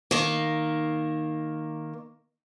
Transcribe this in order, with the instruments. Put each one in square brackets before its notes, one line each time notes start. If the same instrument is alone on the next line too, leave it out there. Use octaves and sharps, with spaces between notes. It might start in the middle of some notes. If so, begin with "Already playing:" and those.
[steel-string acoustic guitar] D#3 A#3